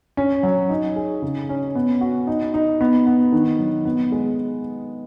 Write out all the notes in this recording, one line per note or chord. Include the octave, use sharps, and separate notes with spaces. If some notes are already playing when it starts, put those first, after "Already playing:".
C#4
F#3
D#4
G#4
C#3
C#4
B3
F#4
D#4
D#4
B3
B3
D#3
F#3
B3
G#3